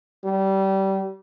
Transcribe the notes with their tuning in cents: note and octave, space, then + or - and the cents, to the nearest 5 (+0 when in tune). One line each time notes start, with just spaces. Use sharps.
G3 -25